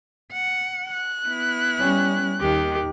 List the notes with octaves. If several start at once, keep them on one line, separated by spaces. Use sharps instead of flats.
F#5
F#6
B3 E4
G3 C#4
D#2 D#3 G4